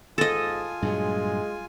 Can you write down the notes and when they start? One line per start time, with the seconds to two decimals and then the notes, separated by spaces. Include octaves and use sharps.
0.18 G#2 F4 A4 D#5 G#5
0.82 G2 A#2 F#3 G#3